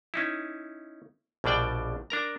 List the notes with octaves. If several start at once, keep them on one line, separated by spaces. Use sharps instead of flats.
C#4 D#4 E4
A#1 B2 G3 D4 D5 G5
D4 A#4 A#5